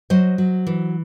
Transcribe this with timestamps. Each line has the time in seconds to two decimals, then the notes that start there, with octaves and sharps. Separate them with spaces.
0.10 F#3 C5 D#5
0.38 F#3
0.67 E3